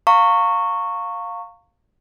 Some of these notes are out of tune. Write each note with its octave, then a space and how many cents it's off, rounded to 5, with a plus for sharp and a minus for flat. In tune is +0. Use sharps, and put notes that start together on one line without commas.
F5 +10 A#5 -35 C#6 +0